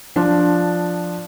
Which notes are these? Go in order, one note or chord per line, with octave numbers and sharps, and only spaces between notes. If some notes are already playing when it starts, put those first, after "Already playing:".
F3 D4 F4